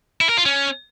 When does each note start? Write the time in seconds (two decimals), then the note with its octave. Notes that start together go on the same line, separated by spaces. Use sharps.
0.21 E4
0.29 A#4
0.37 F4
0.46 C#4